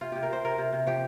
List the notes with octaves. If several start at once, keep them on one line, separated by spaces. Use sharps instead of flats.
C3 F4
C3 G4
A#4
C3 C5
C3 A#4
C3
C3
F3 G4